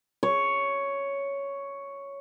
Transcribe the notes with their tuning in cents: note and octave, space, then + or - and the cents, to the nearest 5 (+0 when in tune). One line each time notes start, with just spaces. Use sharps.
C#5 +5